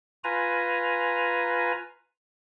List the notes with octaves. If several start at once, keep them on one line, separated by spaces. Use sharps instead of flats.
F4 B4 G#5 A#5